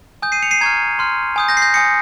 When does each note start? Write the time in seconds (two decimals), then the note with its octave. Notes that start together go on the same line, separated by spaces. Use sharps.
0.22 G#5 D#6 G6
0.32 C7 D#7
0.43 C#7 F7
0.51 C7 D#7
0.61 A#5 C#6 F6 G#6
0.99 C6 F6
1.36 G#5 D#6 G6
1.48 G6 A#6
1.57 C7
1.62 G6 A#6
1.74 G#5 D#6 G6 A#6 C#7